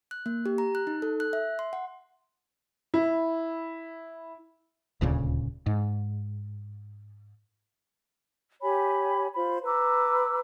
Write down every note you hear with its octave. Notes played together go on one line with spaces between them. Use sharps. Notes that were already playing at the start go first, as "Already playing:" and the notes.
F#6
A#3
G4
A#5
F#6
D#4
A4
F#6
E5
C6
F#5
E4
D#1 D2 A#2 C#3
G#2
G4 C#5 G#5 B5
F4 C5 B5
B4 A#5 D6 E6